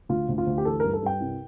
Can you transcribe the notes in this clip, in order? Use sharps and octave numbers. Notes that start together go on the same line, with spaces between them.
D2 F4
D2
F4
D2
G4
E3 A4
G2 A#4
A4
G2 G5
C2